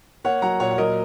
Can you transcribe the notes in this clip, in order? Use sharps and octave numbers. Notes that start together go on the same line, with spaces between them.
A#3 C#5 F#5
F#3 F#5 A#5
A#2 C#5 F#5
F#5
F#3 A#4 D#5